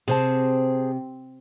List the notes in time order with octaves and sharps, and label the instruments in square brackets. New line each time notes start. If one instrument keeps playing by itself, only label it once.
[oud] C3 [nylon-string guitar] G#4 C5 A5